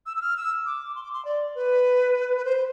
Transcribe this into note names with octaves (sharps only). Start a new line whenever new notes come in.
E6
E6
F6
E6
D6
C6
D6
C6
D5
B4
B4
C5